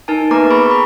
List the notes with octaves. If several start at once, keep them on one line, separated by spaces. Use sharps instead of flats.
D#4 A#4 G#5 A5
A#3 B3 B4 A#5 D6
G#4 B5 C#6
B5 C#6